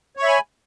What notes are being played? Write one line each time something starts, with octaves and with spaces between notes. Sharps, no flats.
C#5 E5 G#5 B5 C#6